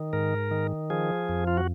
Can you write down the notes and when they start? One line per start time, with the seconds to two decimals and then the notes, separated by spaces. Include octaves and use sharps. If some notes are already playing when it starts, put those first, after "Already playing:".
Already playing: D#3
0.13 G#2 A#4
0.51 D#3
0.90 F3 G#4
1.29 F2
1.47 F4
1.57 F#4